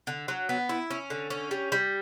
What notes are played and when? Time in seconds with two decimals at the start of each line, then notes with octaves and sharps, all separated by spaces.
0.07 D3
0.28 F#3
0.49 B3
0.69 E4
0.91 C#4
1.10 D3
1.30 C#4
1.51 G3
1.72 G3